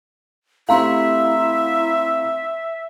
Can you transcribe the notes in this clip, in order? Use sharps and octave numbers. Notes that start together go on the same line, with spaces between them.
A3 C4 E4 G4 E5 F5 A#5 C6